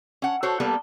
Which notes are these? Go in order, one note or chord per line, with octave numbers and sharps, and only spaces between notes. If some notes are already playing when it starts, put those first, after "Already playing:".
C#4 F#5
F#4 A4 C5 C#5
G3 A#3 B3 A4